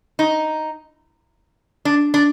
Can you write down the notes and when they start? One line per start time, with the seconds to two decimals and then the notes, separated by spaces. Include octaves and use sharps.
0.19 D#4
1.85 D4
2.14 D4